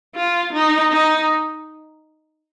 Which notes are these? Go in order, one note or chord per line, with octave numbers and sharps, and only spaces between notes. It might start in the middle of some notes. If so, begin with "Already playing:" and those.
F4
D#4
D#4